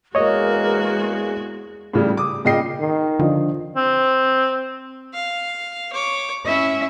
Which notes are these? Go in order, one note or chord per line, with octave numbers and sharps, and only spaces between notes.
E2 G#3 A#3 F#4 G#4 C#5 D#5
A2 C#3 E3 G3
D6 D#6
A#2 C#3 D#5 G5 C7
D#3
D3 F3 D4 D#5
C4
F5
C#5 D6
C#4 E4 E5